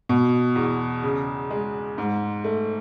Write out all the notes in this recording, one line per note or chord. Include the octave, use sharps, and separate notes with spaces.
B2
E2
C#3
G#3
G#2
A3